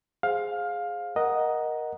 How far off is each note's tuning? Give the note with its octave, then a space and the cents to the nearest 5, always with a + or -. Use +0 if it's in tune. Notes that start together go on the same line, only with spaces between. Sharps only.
G#4 +0 C5 +0 F5 +15
A#4 +15 D#5 +0 F#5 +0